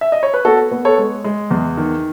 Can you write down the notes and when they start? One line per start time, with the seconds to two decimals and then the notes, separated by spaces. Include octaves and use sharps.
0.01 E5
0.12 D#5
0.23 C#5
0.34 B4
0.45 B3 F#4 A4
0.71 B3
0.85 A4 C#5
0.98 G#3
1.24 G#3
1.51 E2
1.77 D#3